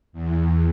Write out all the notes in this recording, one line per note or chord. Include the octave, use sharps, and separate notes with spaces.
E2